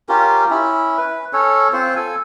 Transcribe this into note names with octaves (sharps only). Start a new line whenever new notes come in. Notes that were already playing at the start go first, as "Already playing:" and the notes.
C#4 F4 G4 A#4
C#4 E4
B4
C#4 A4 C#5
C4 F4 C5
A4 G#5